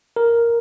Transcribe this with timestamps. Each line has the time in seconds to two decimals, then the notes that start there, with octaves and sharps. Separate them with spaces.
0.16 A#4